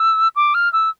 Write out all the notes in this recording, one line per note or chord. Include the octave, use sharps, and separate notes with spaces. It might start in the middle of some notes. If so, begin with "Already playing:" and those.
Already playing: E6
D6
F6
E6